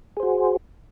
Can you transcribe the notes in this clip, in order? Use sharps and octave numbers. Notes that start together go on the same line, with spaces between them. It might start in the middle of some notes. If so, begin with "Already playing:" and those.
F#4 G#4 C5